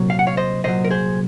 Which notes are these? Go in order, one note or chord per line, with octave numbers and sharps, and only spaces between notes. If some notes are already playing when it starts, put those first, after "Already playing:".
Already playing: C2 A#2 F#3
F5
F#5
C#5 F5
C5 D#5
C2 A#2 F#3 C5 D#5
A#4
G#4 C5